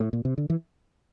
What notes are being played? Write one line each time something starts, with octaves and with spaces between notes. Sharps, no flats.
A2
A#2
C3
D3
E3